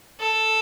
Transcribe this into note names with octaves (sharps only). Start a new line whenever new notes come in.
A4